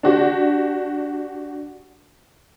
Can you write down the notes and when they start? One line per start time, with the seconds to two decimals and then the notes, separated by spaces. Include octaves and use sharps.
0.03 D4 F#4 G4